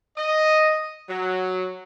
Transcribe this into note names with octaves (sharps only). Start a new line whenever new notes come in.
D#5
F#3